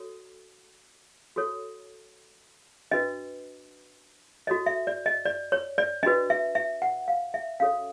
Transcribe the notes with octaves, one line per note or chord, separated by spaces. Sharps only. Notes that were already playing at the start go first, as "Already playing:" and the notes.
Already playing: F#4 A4 C#5
F#4 A4 C#5
D4 F#4 B4 D#5
F#4 A4 C#5 D#5
E5
D5
D#5
D5
C#5
D5
D4 F#4 B4 D#5
E5
E5
F#5
F5
E5
C#4 F#4 A4 C#5 F5